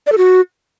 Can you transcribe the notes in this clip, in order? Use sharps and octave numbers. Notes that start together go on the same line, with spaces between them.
D5
A4
F#4